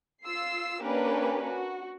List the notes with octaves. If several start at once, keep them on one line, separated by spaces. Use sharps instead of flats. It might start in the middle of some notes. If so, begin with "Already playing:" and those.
F4 E6 C7
A#3 C#4 D4 G4 A#4 B4
F#4